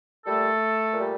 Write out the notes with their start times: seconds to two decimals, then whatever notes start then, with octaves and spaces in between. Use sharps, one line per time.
0.26 A#2 G3 A3 A4
0.93 A#2 G3